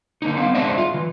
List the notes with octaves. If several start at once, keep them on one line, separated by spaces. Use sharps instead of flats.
D3 A#3 D#4
B3 C4 F5
G#3 D4 C5 D#5 E5
F4
E3